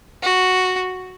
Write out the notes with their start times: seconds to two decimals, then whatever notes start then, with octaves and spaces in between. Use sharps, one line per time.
0.23 F#4